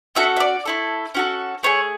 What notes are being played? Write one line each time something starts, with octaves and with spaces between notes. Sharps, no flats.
C#4 F#4 A4 E5
E5
D5
A3 E4 A4
C#4 F#4 A4
A3 E4 G#4 C#5